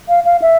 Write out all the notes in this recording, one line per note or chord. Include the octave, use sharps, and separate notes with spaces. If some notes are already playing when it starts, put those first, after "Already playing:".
F5
F5
E5